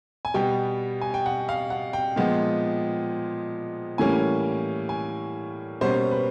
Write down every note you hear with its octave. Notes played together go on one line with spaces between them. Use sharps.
G#5
B2 G3 B3 G5
G#5
G5
F#5
F5
F#5
G5
A#2 F3 G#3 B3
A2 E3 G3 A#3 C#4 G#5
G#5
B2 G3 A#3 C#4 C5
B4